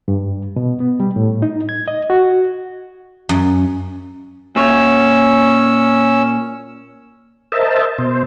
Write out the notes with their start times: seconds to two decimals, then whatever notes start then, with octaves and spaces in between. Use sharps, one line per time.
0.08 G2
0.56 B2
0.80 B3
1.00 G3
1.16 A2
1.42 D#4
1.69 G#6
1.88 D#5
2.10 F#4
3.29 F#2
4.56 A#2 C#4 C#5 E6
7.52 A#4 C5 D#5 E5 A5
7.98 B2 C5